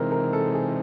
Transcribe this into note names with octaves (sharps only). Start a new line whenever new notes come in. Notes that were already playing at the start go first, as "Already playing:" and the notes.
Already playing: C3 E3 G#3 C4 D#4 A#4
A#4
A4
G#4